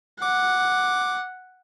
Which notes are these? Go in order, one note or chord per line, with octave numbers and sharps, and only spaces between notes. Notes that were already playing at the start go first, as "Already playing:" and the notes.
F#5 D6